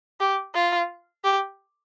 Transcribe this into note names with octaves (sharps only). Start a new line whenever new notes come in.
G4
F4
G4